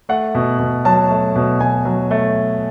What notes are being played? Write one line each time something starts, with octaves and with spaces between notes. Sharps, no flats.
A3 F#5
B2
B2
F#3 A5
A3
B2
B2 G#5
F#3
A3